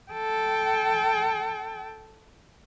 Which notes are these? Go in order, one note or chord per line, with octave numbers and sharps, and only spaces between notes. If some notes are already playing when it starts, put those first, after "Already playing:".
A4 G5